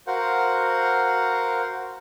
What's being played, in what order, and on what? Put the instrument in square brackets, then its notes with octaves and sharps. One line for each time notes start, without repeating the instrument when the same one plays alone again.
[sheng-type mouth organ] F#4 A#4 C5 F5 F#5